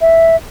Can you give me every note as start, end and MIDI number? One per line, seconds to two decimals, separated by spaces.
0.01 0.36 76